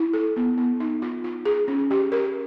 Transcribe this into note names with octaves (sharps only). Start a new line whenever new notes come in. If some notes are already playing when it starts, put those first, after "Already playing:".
Already playing: E4
A4
B3
B3
D#4
F4
F4
G#4
C#4
G4
A#4